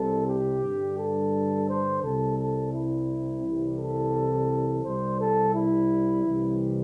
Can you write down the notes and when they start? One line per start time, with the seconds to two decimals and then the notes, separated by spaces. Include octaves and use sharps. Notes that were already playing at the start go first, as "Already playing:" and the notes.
Already playing: C2 C3 G3 A4
0.26 G4
0.62 G2 D3 G3
0.96 A4
1.67 C5
2.02 C2 C3 G3 A4
2.38 A4
2.73 E4
3.43 C2 C3 E3 G3
3.78 A4
4.83 C2 C3 G3 C5
5.19 A4
5.54 E4
6.25 C2 C3 E3 G3